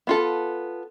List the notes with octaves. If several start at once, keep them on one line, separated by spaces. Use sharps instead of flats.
B3 F4 A4